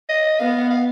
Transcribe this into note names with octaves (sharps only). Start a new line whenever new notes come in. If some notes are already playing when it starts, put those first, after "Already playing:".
D#5
B3 F5
F5